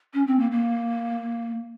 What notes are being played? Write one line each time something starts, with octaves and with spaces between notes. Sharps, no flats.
C#4
C4
A#3
A#3